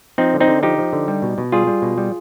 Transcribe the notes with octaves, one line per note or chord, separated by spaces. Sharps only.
F3 C4 D#4
D3
C4 D#4
D3
F3 D#4 G4
F3
D3
G3
B2
B2
G3 F4 G#4
G3
B2
G3